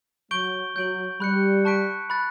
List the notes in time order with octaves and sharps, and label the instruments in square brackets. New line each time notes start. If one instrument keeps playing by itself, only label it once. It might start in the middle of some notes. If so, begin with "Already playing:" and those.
[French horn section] F#3 [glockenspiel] C#6 G6 D7 G7
[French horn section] F#3 [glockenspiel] G6 D7 F#7
[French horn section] G3 [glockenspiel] B5 F#6 C#7
[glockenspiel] A5 C#6 F#6 B6 D7
B5 F#6 A6